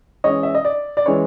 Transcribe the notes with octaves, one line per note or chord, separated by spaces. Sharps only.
E3 G#3 C#4 C#5 D#5
E5
D#5
D5
D5
E3 G#3 C#4 C#5